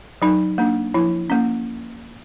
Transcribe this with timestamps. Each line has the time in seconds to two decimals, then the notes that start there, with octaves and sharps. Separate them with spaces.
0.22 F#3 D#4
0.58 A#3 D4
0.94 F3 E4
1.30 A#3 C#4